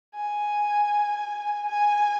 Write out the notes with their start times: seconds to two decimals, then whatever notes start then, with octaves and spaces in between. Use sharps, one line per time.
0.16 G#5
1.69 G#5